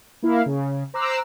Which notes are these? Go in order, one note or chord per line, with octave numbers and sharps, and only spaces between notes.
A#3 E4 A#4 F5
C#3
C5 A#5 D6 E6 F#6 C7